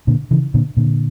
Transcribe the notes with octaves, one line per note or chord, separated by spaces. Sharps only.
A#2 D3
C#3 E3
A#2 D3
A#2 D3